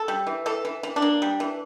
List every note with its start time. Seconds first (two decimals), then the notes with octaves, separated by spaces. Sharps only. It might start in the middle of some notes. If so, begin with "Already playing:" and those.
Already playing: A4
0.08 G3
0.27 E3
0.46 E3 A4
0.65 E3
0.83 E3
0.96 D4
1.02 A#3
1.22 G3
1.40 E3